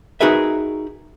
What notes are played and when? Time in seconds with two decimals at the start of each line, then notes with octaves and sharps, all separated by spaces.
0.21 D#4 F#4 G#4 A#4 B4 E5